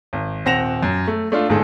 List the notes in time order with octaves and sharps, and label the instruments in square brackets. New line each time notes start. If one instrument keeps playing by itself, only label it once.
[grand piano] G#1
D#1 C4 F#5 A#6 E7 F7
F#2
A3
A3 D4 F4
G1 G#2 G#4 A4